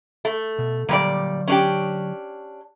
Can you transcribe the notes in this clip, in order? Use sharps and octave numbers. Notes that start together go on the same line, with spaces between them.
A3
B2
A#2 D3 F#3 G3 D5
C#4 D4 G4